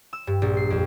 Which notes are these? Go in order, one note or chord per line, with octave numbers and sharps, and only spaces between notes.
E6
G2
A#1
C7
F2